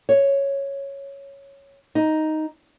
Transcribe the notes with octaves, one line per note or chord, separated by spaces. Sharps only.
C#5
D#4